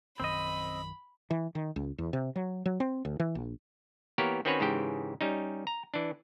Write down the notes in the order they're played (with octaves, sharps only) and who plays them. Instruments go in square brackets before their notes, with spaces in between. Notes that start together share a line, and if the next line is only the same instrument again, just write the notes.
[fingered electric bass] A#1 F#2 D#3 [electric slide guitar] C4 D#5 [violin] B5
[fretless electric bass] E3
D#3
C#2
E2
C3
F#3
F#3
C4
D2
E3
A#1
[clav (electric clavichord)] E3 A#3 B3 G4 A#4 C#5
D#3 C4 C#4 F#4 B4 C#5
G#2 C#3 E3 G4 G5
G3 C#4 D#4
A#5
E3 D4